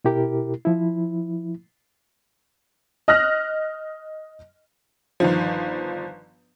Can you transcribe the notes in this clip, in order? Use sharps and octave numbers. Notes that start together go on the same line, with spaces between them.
B2 E4 G4 A#4
F3 E4
D#5 D#6 F6 F#6 A#6
G1 D#3 F3